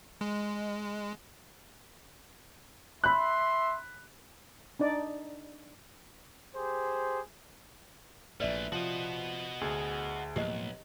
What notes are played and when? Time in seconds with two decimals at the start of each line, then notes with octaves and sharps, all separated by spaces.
0.21 G#3
3.04 E5 B5 C6 F#6
4.80 D4 D#4 D5
6.55 G4 G#4 C5
8.40 A#1 G#2 E3 A3 B4 D5 E5
8.72 C3 F3 F#4 D#5
9.61 D2 G#4
10.36 B1 A2 F3 A#3 G4 D#5